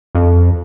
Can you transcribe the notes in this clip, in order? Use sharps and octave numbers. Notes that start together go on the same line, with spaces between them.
F2